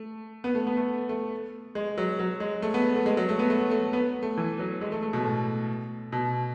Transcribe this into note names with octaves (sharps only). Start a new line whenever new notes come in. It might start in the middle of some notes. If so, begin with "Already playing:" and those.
Already playing: A3
B3
A3
B3
A3
A3
G#3
F#3
F#3
G#3
A3
B3
A3
G#3
F#3
A3
B3
A3
A3
B3
A3
E3
F#3
G#3
A3
A3
B2
A2
B2